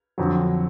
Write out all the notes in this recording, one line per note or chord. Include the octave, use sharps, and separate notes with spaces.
F2 D3 F#3